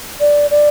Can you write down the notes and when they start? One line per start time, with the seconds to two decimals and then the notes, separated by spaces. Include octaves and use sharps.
0.20 D5
0.51 D5